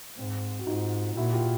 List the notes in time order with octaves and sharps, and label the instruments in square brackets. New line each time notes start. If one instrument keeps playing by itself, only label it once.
[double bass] G#2 [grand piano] C4
[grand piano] F#4
[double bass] G#2 [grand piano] D#4 F4
[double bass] A#2 [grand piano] E4 F#4
[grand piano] F4 G4